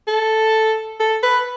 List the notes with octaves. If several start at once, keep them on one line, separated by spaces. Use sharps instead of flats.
A4
A4
B4